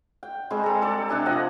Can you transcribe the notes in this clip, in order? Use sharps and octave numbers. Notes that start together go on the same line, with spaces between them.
G5
G3 G#3 C4 G#4
A4 A#5
G4 A4 D5
C3 D4 G4 G#5
F3 D#5 F#5